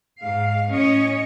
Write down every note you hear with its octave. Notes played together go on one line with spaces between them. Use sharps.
G#2 F5
A2 C#4 C#5 D#5